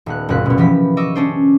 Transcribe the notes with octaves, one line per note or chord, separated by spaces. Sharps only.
D#1 B3 F#6
F#1 D2 A#2 F#6 B6
B2 B3
E3 F3 B3 G4 B6
D#5 C#6 D6 E6
C#4 D4 C5